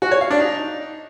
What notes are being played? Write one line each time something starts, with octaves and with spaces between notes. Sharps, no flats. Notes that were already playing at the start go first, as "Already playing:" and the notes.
F#4
C#5
F5
D4
D#4